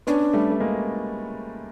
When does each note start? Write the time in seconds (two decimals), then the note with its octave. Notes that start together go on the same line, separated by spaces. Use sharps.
0.07 B3 C#4 D4
0.33 G3 A3
0.50 A3
0.60 G#3 A#3